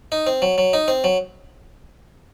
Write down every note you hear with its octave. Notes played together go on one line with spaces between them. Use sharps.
D#4
C4
F#3
F#3
D#4
C4
F#3